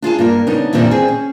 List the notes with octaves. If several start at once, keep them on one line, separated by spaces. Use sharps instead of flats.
D4 F4 G#4 A5
G2 A#3 A#4
C#3 B3 D4 D#4
F2 A#2 D3 E3 G3
C4 G#4
C#4